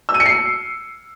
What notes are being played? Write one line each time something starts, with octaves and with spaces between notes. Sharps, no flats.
E6
D#7
C#7
C7